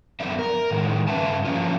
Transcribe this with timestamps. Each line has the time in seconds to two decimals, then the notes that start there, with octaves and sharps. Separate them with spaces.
0.20 F#2 D3 B3 D5 E5
0.39 A#4
0.70 A2 D#3 G#3
1.08 G2 C#3 B4 E5 A5
1.45 F3 A#3 C#4 D4 F4